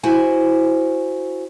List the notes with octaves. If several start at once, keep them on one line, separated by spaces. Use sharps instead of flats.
E4 F#4 C5 G#5